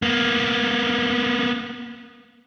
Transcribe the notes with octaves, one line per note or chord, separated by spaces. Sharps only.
A#3 B3